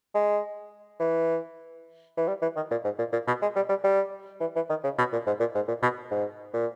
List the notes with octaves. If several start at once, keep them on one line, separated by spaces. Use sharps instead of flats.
G#3
E3
E3
G3
E3
D#3
A#2
G#2
A#2
A#2
B2
G#3
G3
G3
G3
E3
E3
D#3
C#3
B2
A#2
G#2
A#2
G#2
A#2
B2
G#2
A#2